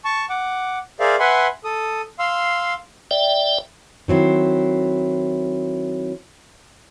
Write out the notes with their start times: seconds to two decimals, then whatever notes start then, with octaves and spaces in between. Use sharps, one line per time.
0.05 A5 C#6
0.30 F#5 D6
1.00 G#4 A#4 C5 D5 E5 F5
1.19 B4 E5 F#5 G#5 B5 C6
1.64 A4 D#6
2.19 F5 C6 E6
3.11 D5 E5 G5
4.08 D#3 F#3 C4 E4